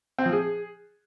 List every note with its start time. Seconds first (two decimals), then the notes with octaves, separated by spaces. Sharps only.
0.18 C4
0.25 F3
0.32 G#4